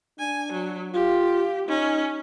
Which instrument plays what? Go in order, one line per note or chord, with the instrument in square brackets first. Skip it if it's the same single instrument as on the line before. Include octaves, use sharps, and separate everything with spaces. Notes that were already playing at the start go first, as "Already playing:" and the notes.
[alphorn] D4 [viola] G#5
[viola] F#3
[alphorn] F4 [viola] G4
[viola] C#4 [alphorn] D#4